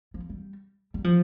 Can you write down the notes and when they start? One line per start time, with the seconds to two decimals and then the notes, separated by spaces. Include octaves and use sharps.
0.14 F3
0.30 G3
0.94 G3
1.04 F3